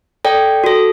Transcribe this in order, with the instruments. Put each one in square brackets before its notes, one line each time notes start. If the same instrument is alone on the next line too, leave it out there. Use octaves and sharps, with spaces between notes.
[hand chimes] A4 D5 G5
F#4 A4